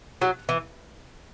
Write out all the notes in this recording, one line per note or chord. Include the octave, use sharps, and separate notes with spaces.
F#3
E3